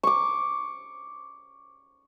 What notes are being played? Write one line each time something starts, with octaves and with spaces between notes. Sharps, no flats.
C#6 D6